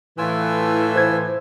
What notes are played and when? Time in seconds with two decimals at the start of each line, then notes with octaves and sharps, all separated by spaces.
0.18 A2 E3 F4 G#5 E6
0.96 C5 G#6